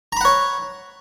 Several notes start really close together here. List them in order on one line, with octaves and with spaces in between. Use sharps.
A#5 B5 F#5 C#5